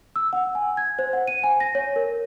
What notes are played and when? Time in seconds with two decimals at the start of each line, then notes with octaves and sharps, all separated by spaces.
0.16 E6
0.33 F#5
0.55 G#5
0.77 G#6
0.99 C5
1.13 F#5
1.28 D#7
1.44 G#5
1.60 A#6
1.75 C#5
1.96 A#4